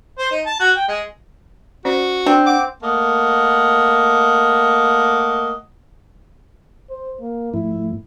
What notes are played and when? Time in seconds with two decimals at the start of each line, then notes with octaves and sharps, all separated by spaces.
0.19 C5
0.31 D#4
0.46 A5
0.60 F#4
0.76 G5
0.88 G#3
1.85 C#4 F#4 C5 D5
2.26 C4 D4
2.46 F#5 D6
2.83 A3 A#3 D#5 F#5
6.90 C5
7.20 A#3
7.54 G#2 F3 A3 E4